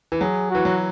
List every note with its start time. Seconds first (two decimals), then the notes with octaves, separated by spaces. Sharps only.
0.12 E3
0.20 F#3 G#4
0.50 E3 F#4
0.65 F#3